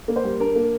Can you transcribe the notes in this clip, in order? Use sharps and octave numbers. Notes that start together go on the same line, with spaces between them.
A#3
C5
G3
D4 A#4
A#3